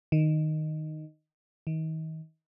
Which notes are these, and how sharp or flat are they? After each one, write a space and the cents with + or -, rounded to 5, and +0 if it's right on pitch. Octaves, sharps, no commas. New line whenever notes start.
D#3 -5
D#3 +35